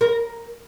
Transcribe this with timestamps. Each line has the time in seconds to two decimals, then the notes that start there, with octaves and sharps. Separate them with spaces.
0.01 A#4